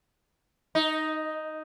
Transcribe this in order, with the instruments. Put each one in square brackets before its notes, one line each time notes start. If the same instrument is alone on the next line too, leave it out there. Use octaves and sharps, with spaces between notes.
[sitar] D#4